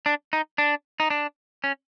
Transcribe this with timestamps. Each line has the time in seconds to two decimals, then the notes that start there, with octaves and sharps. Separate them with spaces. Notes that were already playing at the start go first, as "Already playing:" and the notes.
0.06 D4
0.33 D#4
0.58 D4
1.00 D#4
1.10 D4
1.64 C#4